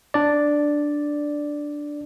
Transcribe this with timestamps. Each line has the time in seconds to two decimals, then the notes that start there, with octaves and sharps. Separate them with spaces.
0.14 D4 D5